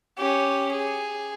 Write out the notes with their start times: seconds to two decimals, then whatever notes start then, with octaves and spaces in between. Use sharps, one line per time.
0.18 C#4 G4
0.72 G#4